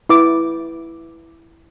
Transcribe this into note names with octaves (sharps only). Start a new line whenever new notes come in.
E4 B4 D6